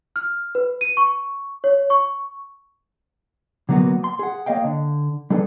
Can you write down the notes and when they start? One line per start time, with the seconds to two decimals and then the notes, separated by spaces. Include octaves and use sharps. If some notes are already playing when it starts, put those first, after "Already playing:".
0.16 F6
0.55 B4
0.81 D#7
0.97 C#6
1.64 C#5
1.90 C#6
3.69 D3 F#3 A#3 B3 F#4
4.04 C6
4.19 G#4 F#5
4.46 A#3 C#5 D#5 F5 G5
4.64 D3
5.30 G3 D4 G#4 A4 B4